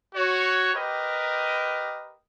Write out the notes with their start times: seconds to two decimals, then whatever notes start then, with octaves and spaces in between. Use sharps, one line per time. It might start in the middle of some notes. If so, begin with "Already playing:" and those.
0.15 F#4 C#5
0.74 G4 A#4 B4 D#5